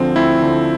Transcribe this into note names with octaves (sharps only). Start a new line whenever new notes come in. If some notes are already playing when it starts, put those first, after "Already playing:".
Already playing: D2 D3 F3 C4
D2 C4 E4
D3 F3